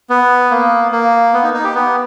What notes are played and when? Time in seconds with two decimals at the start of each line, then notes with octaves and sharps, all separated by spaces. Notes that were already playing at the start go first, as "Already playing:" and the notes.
0.10 B3
0.51 A#3
0.92 A#3
1.34 B3
1.43 D#4
1.54 D#4
1.64 G4
1.74 B3